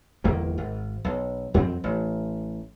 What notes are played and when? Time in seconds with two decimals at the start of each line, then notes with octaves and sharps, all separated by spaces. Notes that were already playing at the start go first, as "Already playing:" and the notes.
0.24 G1 E2 D#3 A#3
0.58 G#1
1.04 B1
1.54 F2 F#3 G3 C4
1.84 A1